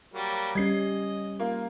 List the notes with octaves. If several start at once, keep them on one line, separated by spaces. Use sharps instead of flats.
F#3 G3 A#3
G3 C#4 D#5 G#6 C7
A#3 F4